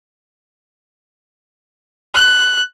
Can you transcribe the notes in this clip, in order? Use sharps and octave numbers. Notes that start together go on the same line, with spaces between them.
F#6